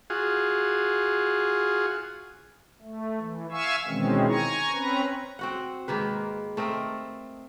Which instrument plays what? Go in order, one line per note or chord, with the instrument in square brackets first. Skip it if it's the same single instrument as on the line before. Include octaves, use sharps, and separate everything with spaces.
[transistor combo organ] F4 F#4 G#4
[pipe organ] A3
E3
E5 F5 G#5 C#6 E6
B2 D#3 E3 G#3 C4 C#4
G#5 A#5 C#6
C4 C#4 B4 A#5
[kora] C4 F#4 F#5
G#2 D#3 A#3 B4
A3 C4 A#4 D#5